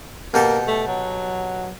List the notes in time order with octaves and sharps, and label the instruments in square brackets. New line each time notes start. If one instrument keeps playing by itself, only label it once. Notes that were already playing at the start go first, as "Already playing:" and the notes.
[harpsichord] B2 G4 A4 [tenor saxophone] A#3
[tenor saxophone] A3
F#3